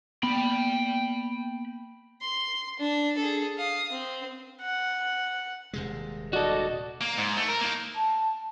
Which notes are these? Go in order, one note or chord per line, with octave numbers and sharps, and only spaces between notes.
A#3 B3 G5 B5
C6
D4
G#4 A4
F5 D#6
C4
F#5
D#1 C3 G#3
F#4 A4 D5 D#5
A#3
G#2
A3
A#4
A#3 D#4
A5